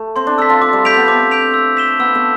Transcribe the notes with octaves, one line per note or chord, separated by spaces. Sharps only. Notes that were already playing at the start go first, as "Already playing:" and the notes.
Already playing: A3
C4 C6
D4
A4 E6 B6
F4
F4 D6
G3
A3 G6 B6 D7 F7
B3
C4 D6
G6 B6 D7 F7
E6
B6 E7 G7
B3 E6
A3